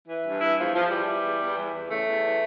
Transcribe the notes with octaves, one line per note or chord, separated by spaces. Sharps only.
E3
G2
E3 E4
E2 F3
E2 F3
E3 G3
E3
E2
E2
E3
E2
C#3 A3
E2
E3